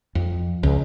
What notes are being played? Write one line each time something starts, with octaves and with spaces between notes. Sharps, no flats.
F2
C#2